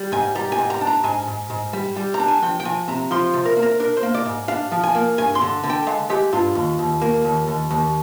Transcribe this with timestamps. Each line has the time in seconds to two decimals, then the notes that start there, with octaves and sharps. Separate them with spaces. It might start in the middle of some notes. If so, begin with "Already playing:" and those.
Already playing: G3
0.12 G#2 G#5
0.35 G3 A#5
0.52 G#5
0.58 G#2
0.70 A#5
0.81 D4
0.87 A#5
1.04 G#2 G#5
1.27 G#2
1.50 G#2
1.73 G3
1.97 G3
2.14 A#5
2.20 D4
2.28 G#5
2.42 F3 G5
2.60 G5
2.65 F3 G#5
2.88 C3 A#5
3.11 F3 C6
3.34 C3
3.45 A#4
3.56 A#3
3.63 A#4
3.80 D4 A#4
3.97 C5
4.03 A#3
4.14 D5
4.26 G#2
4.48 D4 F5
4.72 F3
4.84 G#5
4.95 A#3
5.18 G2 G#5
5.35 C6
5.41 D3
5.64 D3
5.70 G5
5.87 G#3 F5
6.10 G#3 G4
6.33 G2 F4
6.55 D#2
6.79 D#2
7.02 A#3
7.25 D#2
7.47 D#2
7.71 D#2